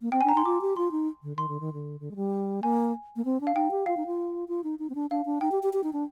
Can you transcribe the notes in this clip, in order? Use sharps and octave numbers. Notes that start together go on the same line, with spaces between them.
A#3
C4 G5
G#5
D4 A#5
D#4 C6
F4 D6
G4
F4 C6
D#4
D3
D#3 C6
D3
D#3
D3
D3
G#3
G3
A#3 G#5
A#3
C4
D4
F5
D#4 G5
G4
F4 F5
D#4
F4
F4
D#4
D#4
C4
D4
D4 F5
D4
D#4 G5
G4
G4
G4
D#4
D4